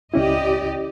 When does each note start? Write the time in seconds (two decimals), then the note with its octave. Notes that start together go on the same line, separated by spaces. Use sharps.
0.14 C#2 C#4 E4 G4 D5 D#5